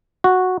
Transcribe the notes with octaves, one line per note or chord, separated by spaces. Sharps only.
F#4